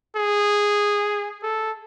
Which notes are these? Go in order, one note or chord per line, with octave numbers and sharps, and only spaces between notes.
G#4
A4